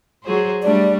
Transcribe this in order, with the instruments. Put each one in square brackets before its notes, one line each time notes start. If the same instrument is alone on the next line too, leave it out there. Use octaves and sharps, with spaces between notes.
[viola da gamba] F#3 G#4 C5
[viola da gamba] G3 A3 D4 [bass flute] D5